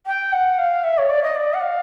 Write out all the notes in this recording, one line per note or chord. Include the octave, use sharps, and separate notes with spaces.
G5
F#5
F5
E5
C#5
D5
D#5
D5
F#5
F5